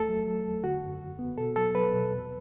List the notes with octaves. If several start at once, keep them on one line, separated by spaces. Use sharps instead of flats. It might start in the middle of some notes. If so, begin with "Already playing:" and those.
Already playing: E2 A3 A4
F#3
F#3
E2
D3 F#4
F#2
F#2
B3
B2 A4
F#3 A4
F#3 B4
B2
E2